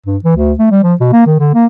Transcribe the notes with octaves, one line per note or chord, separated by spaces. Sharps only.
G2
E3
D2
A3
G3
F3
B2
A#3
D#3
D3
A#3